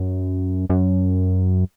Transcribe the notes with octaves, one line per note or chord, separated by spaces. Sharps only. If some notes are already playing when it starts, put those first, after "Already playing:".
Already playing: F#2
F#2